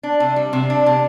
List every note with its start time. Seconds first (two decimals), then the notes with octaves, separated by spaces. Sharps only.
0.03 D4
0.20 C3
0.36 G3
0.53 C3
0.70 D4
0.86 C3